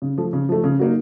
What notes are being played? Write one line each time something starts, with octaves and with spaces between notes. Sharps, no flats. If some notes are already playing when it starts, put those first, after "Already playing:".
C#3
F3 A3
C#3
F3 A3
C#3
F#3 A#3 D#4